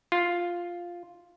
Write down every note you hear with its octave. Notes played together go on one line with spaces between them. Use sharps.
F4